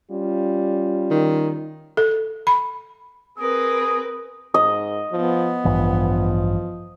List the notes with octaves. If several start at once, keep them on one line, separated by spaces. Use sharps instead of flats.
G3 C#4 F4
D#3
A4
B5
C4 G#4 A#4 B4 D#6
G#2 D#5
F3 B3
A1 G2 E3 F3